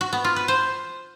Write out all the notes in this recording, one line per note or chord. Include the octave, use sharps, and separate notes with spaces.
F#4
B3
F4
B4
C5